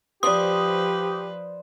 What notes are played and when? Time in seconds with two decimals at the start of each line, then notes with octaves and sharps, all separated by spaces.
0.23 F3 G4 B4 C5 D5 D#6